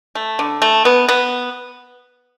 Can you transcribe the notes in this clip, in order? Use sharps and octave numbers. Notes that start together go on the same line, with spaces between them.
A3
D3
A3
B3
B3